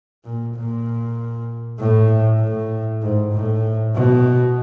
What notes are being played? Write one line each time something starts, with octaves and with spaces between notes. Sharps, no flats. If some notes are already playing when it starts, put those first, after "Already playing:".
A#2
A#2
A2
A2
G#2
A2
B2